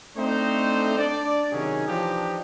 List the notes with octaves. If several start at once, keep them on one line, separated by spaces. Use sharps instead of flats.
A3 C4 D4 D#4 C5
D4 D5
C3 D#3 F#3 C#4 G#4
E3 F3 D4 D#4 G4